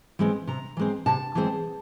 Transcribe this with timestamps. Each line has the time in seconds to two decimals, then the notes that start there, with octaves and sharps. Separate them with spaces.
0.19 E3 G#3 C4
0.47 C3 A#5
0.77 E3 G#3 C4
1.06 C3 A5
1.35 E3 G#3 C4